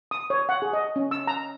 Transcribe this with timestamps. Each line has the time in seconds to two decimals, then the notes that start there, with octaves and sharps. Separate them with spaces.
0.11 D#6
0.30 C#5
0.49 F#5
0.62 G#4
0.73 D#5
0.96 C#4
1.11 E6
1.27 A#5